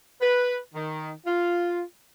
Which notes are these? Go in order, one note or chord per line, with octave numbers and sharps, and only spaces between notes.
B4
D#3
F4